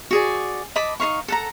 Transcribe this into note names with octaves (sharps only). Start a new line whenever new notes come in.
F#4 G#4 D5
D#5 A5 B5 D6
D#4 C5 F5 C#6
A4 F#5 A#5